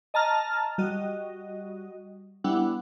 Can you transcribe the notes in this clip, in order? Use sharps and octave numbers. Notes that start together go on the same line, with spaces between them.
D#5 A5 A#5 F6
G3 F#4 D#5
G3 B3 D4 E4 F#5